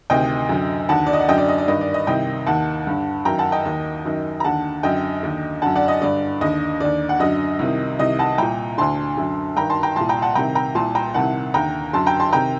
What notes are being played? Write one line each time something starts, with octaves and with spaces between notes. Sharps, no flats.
D2 C3 D#3 D#5 G5
F#2 D3
D#2 D3 F#5 A5
D5
D#5
F#5
F#2 D3 D#5 G5
D5
D#5
D5
G2 D#3 D#5
D5
D#5
C2 C3 D#3 D#5 G5
D#2 D#3 F#5 A5
G2 D3
F#2 D#3 G5 A#5
F#5 A5
D#5 G5
D#2 D#3
F#2 D#3
A#5
D#2 D3 F#5 A5
F#2 D3 D#5 G5
D#2 D3
F#2 D3 F#5 A5
D5 F#5
D#5
G2 D3 D5
D#2 D3 D#5
D#2 D3 D5
F#5
F#2 D3 D#5
C2 C3 D#3
C2 C3 D#3 D#5
F#5 A5
C2 A#2 G5 A#5
D2 D3 A5 C6
F#2 D3
G2 D#3 G5 A#5
A5 C6
G5 A#5
C2 A#2 A5 C6
G5 A#5
F#5 A5
C2 C3 D#3 G5 A#5
G5 A#5
C2 A#2 A5 C6
G5 A#5
C2 C3 D#3 F#5 A5
D#2 D3 G5 A#5
F#2 D3 A5 C6
G5 A#5
A5 C6
C3 D#3 G5 A#5